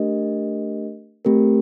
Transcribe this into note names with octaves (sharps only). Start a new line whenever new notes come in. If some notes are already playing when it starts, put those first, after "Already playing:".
Already playing: A3 D4 G4 A#4 D#5
A3 C4 G4 A#4